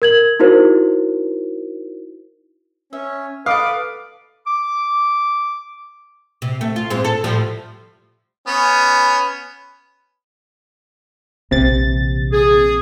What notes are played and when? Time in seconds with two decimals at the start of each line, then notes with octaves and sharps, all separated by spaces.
0.02 A#4 G#6 F#7
0.40 D#4 E4 F#4 A#4 C5
2.93 C#4 E5
3.46 A4 B4 F5 D6 D#6
4.47 D6
6.42 C3
6.61 A3
6.76 F4
6.90 G#2 G#3 C4
7.05 A4
7.24 A2 F3 G3
8.47 B3 C#4
11.51 A#1 C3 E3 A6
12.32 G#4